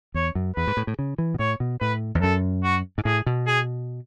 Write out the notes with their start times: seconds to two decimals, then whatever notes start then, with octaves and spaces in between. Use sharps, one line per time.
0.14 E2 C#5
0.35 F#2
0.56 E2 B4
0.67 G#2
0.77 A2
0.87 A2
0.99 C#3
1.18 E3
1.34 B2
1.39 A2 C#5
1.60 B2
1.81 A2 B4
2.15 E2
2.22 F#2 A4
2.64 F#4
2.98 G#2
3.05 A2 G#4
3.26 B2
3.47 G#4